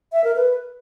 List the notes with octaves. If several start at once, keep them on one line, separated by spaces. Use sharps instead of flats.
E5
A#4
B4